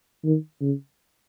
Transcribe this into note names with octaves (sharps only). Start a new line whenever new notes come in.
D#3
C#3